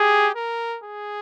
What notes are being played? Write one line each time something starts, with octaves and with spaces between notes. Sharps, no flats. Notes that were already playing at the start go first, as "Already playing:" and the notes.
Already playing: G4 G#4
A#4
G#4